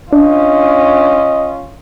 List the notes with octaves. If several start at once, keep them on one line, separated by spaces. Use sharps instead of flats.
C#4 D4 F4 D#5